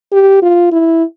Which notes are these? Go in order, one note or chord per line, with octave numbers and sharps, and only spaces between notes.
G4
F4
E4